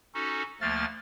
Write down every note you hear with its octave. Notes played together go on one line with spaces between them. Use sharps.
C#4 D#4 F#4 A4
D2 F3 A3 A#3 F6 A6